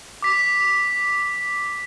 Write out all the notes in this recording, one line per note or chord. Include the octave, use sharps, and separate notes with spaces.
D6 B6